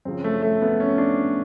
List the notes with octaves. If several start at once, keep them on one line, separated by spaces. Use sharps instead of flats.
F#2 C#3 F3 C4
A3
A3
B3
C#4
D4